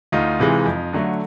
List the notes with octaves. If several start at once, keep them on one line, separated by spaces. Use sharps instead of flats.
D2 D#4 F4
C3 E3 G#3
F2
D3 F#3 A3